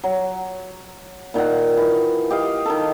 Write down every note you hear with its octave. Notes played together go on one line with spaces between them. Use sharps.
F#3
A#2 D#3 A#4 F#5
E3
G4 D#5 F5
D#3 A4